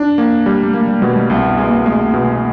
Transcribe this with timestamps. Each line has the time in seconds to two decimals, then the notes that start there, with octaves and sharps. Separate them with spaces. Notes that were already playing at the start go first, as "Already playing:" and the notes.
Already playing: D4
0.18 A#3
0.46 G3
0.63 A3
0.74 G#3 A#3
0.87 G3
1.02 B2 G#3
1.16 A3
1.30 C2 A#3
1.49 B3
1.58 G#3
1.67 A#3
1.86 G#3 A3
2.14 B2